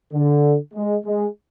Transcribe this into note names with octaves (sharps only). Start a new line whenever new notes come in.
D3
G#3
G#3